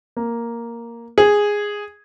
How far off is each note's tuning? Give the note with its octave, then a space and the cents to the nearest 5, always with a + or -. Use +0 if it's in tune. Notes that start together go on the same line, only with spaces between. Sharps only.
A#3 +0
G#4 -5